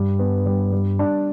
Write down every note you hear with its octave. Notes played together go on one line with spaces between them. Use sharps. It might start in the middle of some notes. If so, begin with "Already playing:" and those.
Already playing: G2 G3
B3
G3
G3
D4